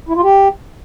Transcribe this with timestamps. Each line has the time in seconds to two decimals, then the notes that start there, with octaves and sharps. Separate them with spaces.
0.09 E4
0.16 F4
0.23 G4